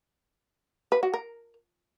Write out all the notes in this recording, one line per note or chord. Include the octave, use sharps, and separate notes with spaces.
B4
F#4
A#4